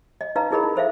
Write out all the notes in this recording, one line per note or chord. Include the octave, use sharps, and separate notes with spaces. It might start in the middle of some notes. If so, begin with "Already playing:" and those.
D#5
D#4 B4 D#5 F5 A#5
D#4 E4 G#4 A#4 D#5 B5
D#4
A4 C5 E5 F5